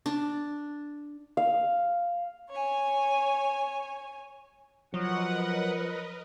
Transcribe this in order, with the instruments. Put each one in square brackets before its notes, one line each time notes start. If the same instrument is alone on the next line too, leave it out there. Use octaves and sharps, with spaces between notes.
[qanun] D4
[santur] F5
[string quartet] C#5 G#5
[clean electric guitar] F3 [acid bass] F#3 [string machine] A#4 B4 D#5 [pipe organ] F#5